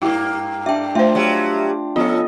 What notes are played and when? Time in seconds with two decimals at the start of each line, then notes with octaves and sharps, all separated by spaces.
0.02 G2 A#3 E4 G4
0.66 D4 G4 E5 G5
0.95 A3 F4 C5 E5
1.15 F#3 G3
1.96 F3 B3 C#4 F4 A4 D#5